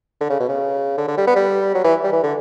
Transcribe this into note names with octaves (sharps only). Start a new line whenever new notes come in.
D3
C#3
B2
C#3
D3
D3
G3
B3
G3
F#3
E3
G3
E3
D3